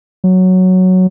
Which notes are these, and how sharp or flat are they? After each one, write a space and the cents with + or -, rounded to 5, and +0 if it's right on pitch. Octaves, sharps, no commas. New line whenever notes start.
F#3 +0